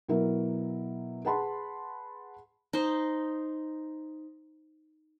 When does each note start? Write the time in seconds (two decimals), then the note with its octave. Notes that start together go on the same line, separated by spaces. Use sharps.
0.08 B2 F#3 E4 A#4
1.25 G#4 B4 F#5 A5 B5 C6
2.73 D#4 C5